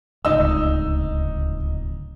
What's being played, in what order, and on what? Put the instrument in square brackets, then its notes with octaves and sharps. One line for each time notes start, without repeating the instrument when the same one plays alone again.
[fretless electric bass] D1 C#2 [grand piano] D#4 E6